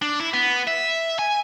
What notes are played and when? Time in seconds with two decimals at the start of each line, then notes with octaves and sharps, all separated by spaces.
0.02 D4
0.20 E4
0.34 B3
0.68 E5
1.19 G#5